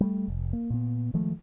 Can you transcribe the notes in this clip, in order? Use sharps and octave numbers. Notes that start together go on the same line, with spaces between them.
G3 A3
F1
A#3
A#2 B3
D#3 F3 G#3 A3